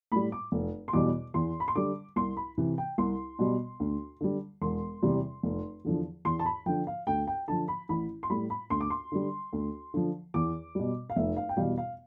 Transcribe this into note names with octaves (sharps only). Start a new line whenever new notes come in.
A2 G3 B5
D6
F1
C6
E2 B2 G3 D6
E2 C6
B5
C6
D3 G3 D6
C2 C6
B5
C3 E3
G5
C2 C6
B2 G3
D2
D3 G3
E1 C6
E2 C3 G3
F1
E2 D3 F3
E2 C6
A5
B5
D3 F3 G5
F5
D2 G5
G5
D3 F3 A5
B5
A1 B5
C6
A2 G3 B5
B5
D2 C6
D6
C6
D3 G3
D2
D3 F3
E2 D6
B2 G3
F5
F1 E5
F5
G5
E2 B2 G3 F5
F5